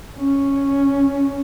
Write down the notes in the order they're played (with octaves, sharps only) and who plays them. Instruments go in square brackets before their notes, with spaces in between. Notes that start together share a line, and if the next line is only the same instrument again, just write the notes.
[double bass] C#4